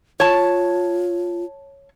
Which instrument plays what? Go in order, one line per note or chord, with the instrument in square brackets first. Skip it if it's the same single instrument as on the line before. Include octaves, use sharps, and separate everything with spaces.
[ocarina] F4 [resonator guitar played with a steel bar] C#5 A5